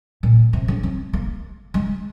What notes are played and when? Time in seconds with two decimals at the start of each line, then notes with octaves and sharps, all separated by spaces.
0.23 A#2
0.53 C3
0.68 C#3
0.83 C4
1.13 A#3
1.74 G#3